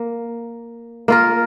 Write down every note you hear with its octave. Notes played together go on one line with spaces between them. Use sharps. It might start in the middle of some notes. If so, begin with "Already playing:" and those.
Already playing: A#3
A#3 F4 A#4